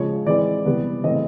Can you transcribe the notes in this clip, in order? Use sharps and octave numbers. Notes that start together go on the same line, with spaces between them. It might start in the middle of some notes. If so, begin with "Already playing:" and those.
Already playing: C#3 F3 G#3 C#5
E3 G#3 C4 D5
C3 E3 G3 B3
C#3 E3 A3 C4 D#5